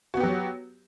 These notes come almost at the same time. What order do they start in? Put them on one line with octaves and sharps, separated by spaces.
F#4 B3 G4 F#3